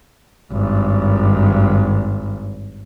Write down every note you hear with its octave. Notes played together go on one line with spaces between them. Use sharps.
G#1 G2